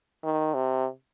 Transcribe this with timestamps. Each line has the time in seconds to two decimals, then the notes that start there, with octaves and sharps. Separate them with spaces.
0.24 D#3
0.54 C3